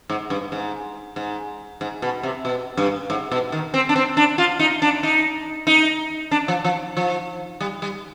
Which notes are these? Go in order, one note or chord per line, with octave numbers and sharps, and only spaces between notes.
G#2
G2
G#2
G#2
G#2
B2
C3
B2
G2
G#2
B2
D#3
C4
D4
C4
D4
F4
D#4
D4
D#4
D#4
D4
F3
F3
F3
G3
G3